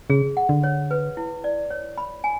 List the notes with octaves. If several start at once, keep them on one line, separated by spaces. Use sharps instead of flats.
C#3 G#4
F#5
D3
C#5
B4
E4
D5
C#5
B5
G#5